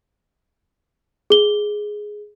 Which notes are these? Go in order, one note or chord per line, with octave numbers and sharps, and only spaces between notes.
G#4 G7